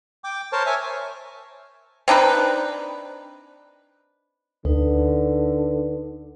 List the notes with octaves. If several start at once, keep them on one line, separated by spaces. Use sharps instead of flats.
G5 D6
A#4 C5 C#5 A5
C#5 E5 G#5
C4 D4 D#4 B4
D2 D3 D#4 B4